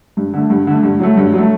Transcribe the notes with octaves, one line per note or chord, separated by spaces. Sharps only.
G2
D3 A3
G2
D3 A3
G2
F#3 A3
G2
F#3 A3